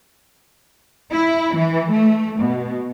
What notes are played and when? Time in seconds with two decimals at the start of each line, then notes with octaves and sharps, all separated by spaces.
1.12 E4
1.56 E3
1.90 A3
2.40 B2